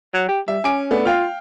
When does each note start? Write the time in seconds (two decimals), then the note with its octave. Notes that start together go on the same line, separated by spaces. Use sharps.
0.14 F#3
0.28 G4
0.48 G3 E5
0.64 C#4 G#5 D6 D7
0.91 A3 B3 D4
1.05 F4 F5 G5 F6